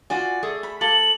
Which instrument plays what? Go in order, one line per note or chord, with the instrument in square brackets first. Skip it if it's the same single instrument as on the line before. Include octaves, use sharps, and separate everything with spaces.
[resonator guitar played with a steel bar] F4 F#4 G#5 [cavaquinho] D5
[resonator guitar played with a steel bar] A3 G#4 A4
[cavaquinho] B5
[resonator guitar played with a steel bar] A#3 [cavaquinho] A4 [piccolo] F#7